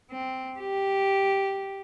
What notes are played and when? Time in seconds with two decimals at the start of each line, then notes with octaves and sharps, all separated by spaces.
0.11 C4
0.59 G4